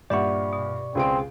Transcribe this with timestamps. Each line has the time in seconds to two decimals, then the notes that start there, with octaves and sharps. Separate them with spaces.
0.10 G2 A#2 G4 D5 E5 F#5 C#6
0.53 B2
0.95 C#2 C4 G#4 D7